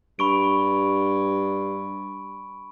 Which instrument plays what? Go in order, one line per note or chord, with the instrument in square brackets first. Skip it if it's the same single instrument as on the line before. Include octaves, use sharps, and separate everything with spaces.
[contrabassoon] G2 [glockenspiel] B5 C#6 D7